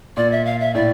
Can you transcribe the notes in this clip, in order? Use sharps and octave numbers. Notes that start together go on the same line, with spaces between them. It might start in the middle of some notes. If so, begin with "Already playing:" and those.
A#2 D5
E5
F5
E5
A2 D5